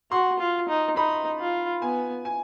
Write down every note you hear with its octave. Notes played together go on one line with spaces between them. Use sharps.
F#4 C6
F4
D#4
D#4 B5
F4
B3 G#5
G#5